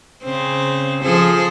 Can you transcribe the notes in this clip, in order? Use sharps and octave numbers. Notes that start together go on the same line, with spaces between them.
C#3 C4
F3 G#4 A4